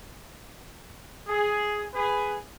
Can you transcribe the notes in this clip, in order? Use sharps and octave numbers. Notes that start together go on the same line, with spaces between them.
G#4
G#4 B4